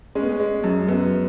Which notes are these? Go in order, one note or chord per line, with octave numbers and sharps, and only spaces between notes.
G#3 C#4
B3
C#4
G#3
F#2
F#2 B3